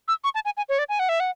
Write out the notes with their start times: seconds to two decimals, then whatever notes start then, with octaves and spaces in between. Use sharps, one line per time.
0.08 E6
0.24 C#6
0.35 A5
0.45 G#5
0.57 G#5
0.69 C#5
0.79 D5
0.89 G#5
0.99 F#5
1.09 E5
1.20 F#5